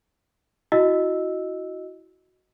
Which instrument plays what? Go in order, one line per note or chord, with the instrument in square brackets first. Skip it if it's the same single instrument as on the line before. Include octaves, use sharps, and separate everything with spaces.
[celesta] E4 F#4 D#5 E6